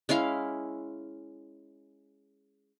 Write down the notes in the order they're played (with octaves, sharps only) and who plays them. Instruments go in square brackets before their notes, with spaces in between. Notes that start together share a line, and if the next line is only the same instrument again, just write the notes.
[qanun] G#3 C#4 E4 F5